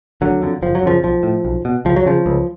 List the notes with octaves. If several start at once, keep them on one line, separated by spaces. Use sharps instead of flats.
F1 D3 F#3
F2 D3
F#1 F3
F#3
F#2 C#3 F3
B1 F3
A2
B1
B2
C#2 F3
F#3
C#3 F3
C#2